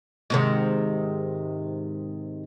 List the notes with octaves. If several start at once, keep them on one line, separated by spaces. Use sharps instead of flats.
G#2 C3 D#3